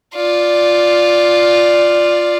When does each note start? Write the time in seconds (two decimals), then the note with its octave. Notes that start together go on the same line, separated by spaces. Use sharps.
0.15 F4 D5